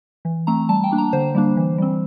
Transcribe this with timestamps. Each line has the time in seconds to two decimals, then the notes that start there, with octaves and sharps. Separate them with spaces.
0.25 E3
0.47 A3 C4 A#5
0.69 G3 A5
0.84 G5
0.91 A#3 D4
0.98 A#5
1.13 D3 C5
1.35 G3 A#3 D4
1.57 E3
1.78 G3 C4